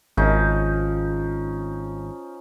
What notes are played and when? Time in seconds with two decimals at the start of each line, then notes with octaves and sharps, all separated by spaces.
0.17 G#1 F3 C#4 D#4